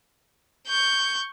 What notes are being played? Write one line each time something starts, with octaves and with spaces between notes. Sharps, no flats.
C#6 G6